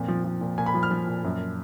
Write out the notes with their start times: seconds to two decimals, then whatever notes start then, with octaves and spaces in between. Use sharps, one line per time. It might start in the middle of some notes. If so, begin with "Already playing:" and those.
Already playing: F2 A#2
0.08 F3
0.24 F3
0.41 A#2
0.58 A#2 G#5
0.66 B5
0.74 F3
0.83 F6
0.91 F3
1.07 A#2
1.24 F#2